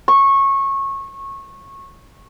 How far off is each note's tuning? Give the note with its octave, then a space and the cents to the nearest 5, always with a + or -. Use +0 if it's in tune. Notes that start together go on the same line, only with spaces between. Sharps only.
C#6 -20